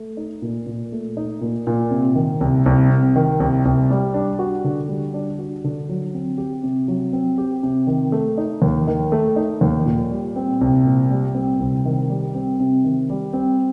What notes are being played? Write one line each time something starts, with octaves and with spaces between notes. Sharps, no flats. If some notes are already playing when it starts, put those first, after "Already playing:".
Already playing: A3
D#4
A#2
A#2
A3
D#4
A#2
A#2
C3
D#3
C2
C2
C3
D#3
C2
C2
G3
D4
F#4
D3
G3
D4
F#4
D3
F#3
C4
G4
C3
F#3
C4
G4
C3
D#3
A3
D#4
D#2
D#3
A3
D#4
D#2
A#2
G3
C4
C2
A#2
G3
C4
C2
D#3
G3
C4
C3
D#3
G3
C4